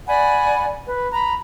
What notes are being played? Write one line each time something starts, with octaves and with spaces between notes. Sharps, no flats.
D5 F#5 G#5 B5
B4
A#5 B5